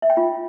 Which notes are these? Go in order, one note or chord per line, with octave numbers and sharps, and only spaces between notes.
E5
G5
F4